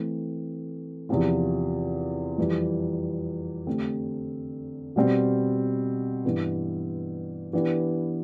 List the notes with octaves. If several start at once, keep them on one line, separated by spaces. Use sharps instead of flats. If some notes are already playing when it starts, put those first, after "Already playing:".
Already playing: E3 A3 C4
E2 C3 F3 C4 F4
F2 E3 G3
D3 A3 C4 G4
B2 G3 C4
G2 E3 B3
E3 B3 D4 G4